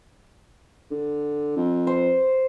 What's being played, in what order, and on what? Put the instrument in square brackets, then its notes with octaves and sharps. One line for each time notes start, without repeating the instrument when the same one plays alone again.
[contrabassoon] D3
F2
[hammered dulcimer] C5